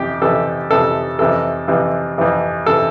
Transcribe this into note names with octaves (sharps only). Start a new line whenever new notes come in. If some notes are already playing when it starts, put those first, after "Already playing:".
Already playing: F2 C3 E3 G4
F2 C3 E3 A4
F2 C3 E3 A4
F2 C3 E3 A4
F2 C3 E3
F2 C3 E3
C3 E3 A4